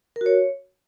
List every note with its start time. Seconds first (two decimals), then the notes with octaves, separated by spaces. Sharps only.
0.16 A#4
0.21 F#4
0.26 C#5